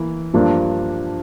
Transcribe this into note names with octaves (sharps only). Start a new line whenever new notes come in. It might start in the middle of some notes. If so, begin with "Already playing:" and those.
Already playing: E3 A#3
G2 F3 A#3 D4